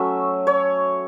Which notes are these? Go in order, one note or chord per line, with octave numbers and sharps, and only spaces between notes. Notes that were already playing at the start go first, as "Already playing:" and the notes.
Already playing: F#3 A3 C#4 E5
C#5